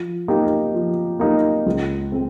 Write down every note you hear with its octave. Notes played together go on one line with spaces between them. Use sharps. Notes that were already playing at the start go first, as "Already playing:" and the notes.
Already playing: F3
A#3 D#4 G4
F3
A#3 D#4 G4
C#2
G#3 C4